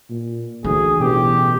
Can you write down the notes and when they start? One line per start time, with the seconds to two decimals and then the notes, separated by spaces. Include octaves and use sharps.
0.10 A#2
0.64 D2 E3 G#4
1.00 A1 B2 G4